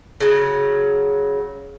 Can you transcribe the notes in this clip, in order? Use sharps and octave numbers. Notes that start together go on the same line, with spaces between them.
C#3 F#3